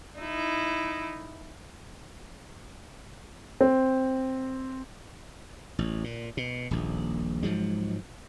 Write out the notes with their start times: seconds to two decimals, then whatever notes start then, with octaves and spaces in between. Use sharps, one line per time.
0.19 D#4 E4
3.61 C4
5.79 A1
6.04 A#2
6.37 B2
6.71 D#1 A#1
7.43 G#2 F3 F#3 G#3